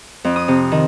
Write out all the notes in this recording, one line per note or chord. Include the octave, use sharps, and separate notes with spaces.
F2
D#6
C3
D#3